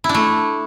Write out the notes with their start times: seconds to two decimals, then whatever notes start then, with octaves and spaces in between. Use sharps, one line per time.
0.04 E4
0.09 D4
0.14 A3